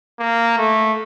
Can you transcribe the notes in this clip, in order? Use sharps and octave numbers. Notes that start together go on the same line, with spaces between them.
A#3
A3